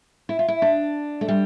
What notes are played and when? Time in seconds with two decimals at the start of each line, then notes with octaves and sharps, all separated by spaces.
0.29 E4
0.39 F4
0.48 E4
0.62 D4
1.21 A3
1.28 G3